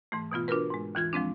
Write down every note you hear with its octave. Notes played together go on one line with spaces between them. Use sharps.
G#2 E3 A3
B2 E3 B3 F4
D4 F4 F#4 A#4 B4
G#2 G#3
D#2 E3 F4 G#6
F3 G#3 C4 D4